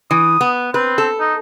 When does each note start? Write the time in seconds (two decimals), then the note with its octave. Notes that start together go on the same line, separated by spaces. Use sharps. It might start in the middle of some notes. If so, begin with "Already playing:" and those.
0.11 E3 D#6
0.41 B3
0.74 C4 B4
0.98 A4
1.20 D#4